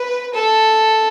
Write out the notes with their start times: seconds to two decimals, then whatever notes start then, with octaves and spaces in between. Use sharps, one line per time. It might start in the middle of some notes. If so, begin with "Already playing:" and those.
Already playing: B4
0.34 A4